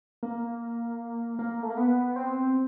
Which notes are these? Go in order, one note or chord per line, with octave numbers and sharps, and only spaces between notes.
A#3
A#3
A3
A#3
B3
C4